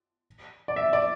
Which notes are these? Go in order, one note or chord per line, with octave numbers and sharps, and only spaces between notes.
D5
E5
D5